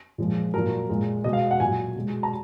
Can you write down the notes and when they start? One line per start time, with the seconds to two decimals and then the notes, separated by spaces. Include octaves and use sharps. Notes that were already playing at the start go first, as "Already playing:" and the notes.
0.18 A#2 F3 G#3
0.54 A#2 F#3 A#4
0.89 A#2 G#3
1.24 B2 G#3 D#5
1.33 F5
1.51 F#5
1.60 A#2 F#3 G#5
1.96 B2 G#3
2.23 A#5